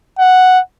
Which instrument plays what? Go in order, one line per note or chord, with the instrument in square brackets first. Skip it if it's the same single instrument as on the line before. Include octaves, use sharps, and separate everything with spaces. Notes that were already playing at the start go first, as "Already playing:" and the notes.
[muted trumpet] F#5